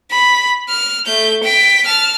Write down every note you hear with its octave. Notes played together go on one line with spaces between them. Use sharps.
B5
F6
A3 G6
G5 B6
A5 F6